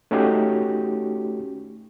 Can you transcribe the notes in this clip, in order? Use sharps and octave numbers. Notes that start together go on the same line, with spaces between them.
A3 C#4 D#4 F#4 G4